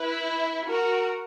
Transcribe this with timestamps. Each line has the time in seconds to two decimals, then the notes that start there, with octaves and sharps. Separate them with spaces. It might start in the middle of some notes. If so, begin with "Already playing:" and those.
Already playing: E4 B4
0.69 F#4 A#4